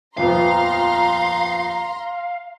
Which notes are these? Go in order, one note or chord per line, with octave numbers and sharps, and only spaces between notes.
D#1 F2 B3 F5 A#5 C6